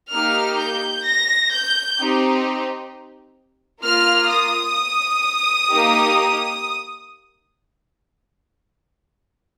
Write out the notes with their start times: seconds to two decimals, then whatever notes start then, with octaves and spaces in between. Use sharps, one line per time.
0.11 A#3 D#4 G4 F6
0.58 G6
1.04 A#6
1.51 G6
1.97 C4 D#4 G4
3.83 A#3 F4 F6
4.29 D#6
5.68 A#3 D#4 G4